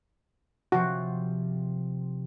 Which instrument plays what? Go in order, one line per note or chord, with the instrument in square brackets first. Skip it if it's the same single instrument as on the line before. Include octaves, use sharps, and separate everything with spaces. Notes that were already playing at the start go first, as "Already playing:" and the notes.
[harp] C3 F3 C4 [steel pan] F#4